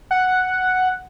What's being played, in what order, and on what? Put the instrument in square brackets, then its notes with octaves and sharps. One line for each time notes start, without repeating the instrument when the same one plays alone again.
[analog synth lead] F#5